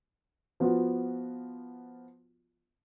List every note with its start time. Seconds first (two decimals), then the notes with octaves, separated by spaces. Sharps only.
0.60 F3 B3 F4 F#4